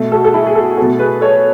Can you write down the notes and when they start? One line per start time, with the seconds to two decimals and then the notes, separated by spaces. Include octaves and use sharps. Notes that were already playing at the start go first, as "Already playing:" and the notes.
Already playing: B2 A3
0.12 F#4 A4
0.24 A4
0.34 E4 G#4
0.46 G#4
0.55 F#4 A4
0.77 B2 A3 F#4 A4
0.99 G#4 B4
1.21 A4 C#5